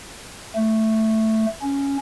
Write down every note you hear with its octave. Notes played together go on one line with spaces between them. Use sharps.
A3
C#4